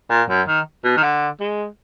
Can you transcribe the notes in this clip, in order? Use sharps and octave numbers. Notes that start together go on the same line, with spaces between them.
A#2
F#2
D#3
B2
D#3
D3
G#3